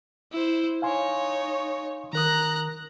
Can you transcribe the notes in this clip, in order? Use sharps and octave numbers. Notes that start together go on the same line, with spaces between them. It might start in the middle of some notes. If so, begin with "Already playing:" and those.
E4 C5
D#4 C#5 F5 G#5 C6
D#3 A#4 A#5 D#6 F#6